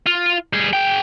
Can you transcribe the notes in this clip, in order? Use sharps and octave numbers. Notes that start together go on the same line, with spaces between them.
F4
G3 G#4
G#4 G5